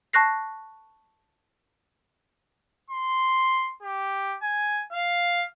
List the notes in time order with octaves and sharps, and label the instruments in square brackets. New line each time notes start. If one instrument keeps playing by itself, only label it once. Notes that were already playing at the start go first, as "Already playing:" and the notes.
[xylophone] A5 C#6 F#6 A#6 C7
[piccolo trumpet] C6
G4
G#5
F5